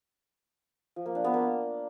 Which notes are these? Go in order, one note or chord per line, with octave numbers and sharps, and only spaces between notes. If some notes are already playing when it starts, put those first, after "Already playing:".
F3
A#3
D4
B3
A#3